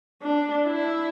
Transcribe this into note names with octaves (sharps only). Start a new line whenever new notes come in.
D4
E4